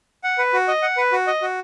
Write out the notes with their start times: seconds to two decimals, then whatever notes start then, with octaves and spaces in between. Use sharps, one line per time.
0.24 F#5
0.38 B4
0.53 F#4
0.68 D#5
0.82 F#5
0.97 B4
1.12 F#4
1.27 D#5
1.42 F#4